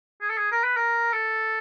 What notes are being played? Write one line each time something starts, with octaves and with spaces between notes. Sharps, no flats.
G#4
A4
G#4
A#4
B4
A#4
A4